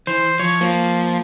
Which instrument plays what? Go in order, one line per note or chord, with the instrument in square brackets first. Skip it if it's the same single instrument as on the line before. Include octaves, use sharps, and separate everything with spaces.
[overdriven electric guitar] E3 [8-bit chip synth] C5
[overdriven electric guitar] F3 [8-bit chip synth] C#5
[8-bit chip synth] F3 [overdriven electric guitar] A#3